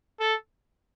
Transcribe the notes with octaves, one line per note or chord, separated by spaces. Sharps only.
A4